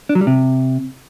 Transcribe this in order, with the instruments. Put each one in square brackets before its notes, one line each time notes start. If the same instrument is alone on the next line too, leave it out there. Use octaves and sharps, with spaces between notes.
[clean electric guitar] D4
F#3
G3
C3